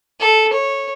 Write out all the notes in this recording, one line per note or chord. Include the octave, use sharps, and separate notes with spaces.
A4
C#5